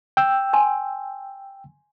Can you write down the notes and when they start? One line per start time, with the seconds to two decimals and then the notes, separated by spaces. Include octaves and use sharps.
0.17 G5 E6
0.53 G#5 C6